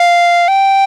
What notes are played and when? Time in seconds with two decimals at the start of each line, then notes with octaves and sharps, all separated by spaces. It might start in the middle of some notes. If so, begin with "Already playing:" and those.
Already playing: F5
0.48 G5